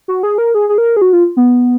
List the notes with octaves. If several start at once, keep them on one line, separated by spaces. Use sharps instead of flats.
F#4
G#4
A#4
G#4
G#4
A#4
G#4
F#4
F4
B3